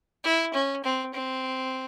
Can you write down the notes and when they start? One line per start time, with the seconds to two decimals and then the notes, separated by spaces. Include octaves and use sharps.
0.24 E4
0.53 C#4
0.83 C4
1.13 C4